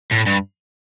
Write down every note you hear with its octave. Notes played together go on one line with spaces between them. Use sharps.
A2
G2